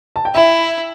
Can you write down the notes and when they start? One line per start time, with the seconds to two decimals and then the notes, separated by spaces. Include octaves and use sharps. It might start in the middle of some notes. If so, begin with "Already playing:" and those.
0.16 A5
0.25 G5
0.34 E4 E5